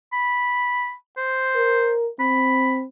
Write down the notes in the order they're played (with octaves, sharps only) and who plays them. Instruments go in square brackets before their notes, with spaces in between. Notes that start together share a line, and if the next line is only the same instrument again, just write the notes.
[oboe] B5
C5
[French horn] A#4
[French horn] C4 [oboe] B5